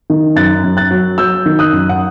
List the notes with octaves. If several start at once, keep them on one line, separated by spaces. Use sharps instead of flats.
D#3
F#2 F#6 A6
F#2
F#6 A6
F#3
F#3 E6 G6
D#3
D#6 F#6
F#2
F#5